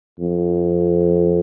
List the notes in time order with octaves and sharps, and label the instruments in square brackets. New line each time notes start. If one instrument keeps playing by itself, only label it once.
[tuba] F2